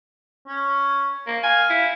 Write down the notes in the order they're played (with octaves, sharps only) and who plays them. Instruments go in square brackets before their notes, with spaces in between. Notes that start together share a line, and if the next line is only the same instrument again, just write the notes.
[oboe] C#4
[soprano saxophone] A#3
[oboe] F5 [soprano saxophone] G#5
[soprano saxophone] E4